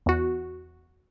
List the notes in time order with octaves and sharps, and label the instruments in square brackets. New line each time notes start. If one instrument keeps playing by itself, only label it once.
[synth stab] E2 F#4